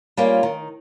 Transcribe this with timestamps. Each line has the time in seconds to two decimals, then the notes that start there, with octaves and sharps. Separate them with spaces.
0.17 G3 A#3 C#4 F4
0.43 D#3